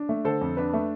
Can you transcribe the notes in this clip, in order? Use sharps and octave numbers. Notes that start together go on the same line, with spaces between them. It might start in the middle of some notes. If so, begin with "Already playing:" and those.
Already playing: D4
A3
D3 A4 C5
F2
D4 B4
A3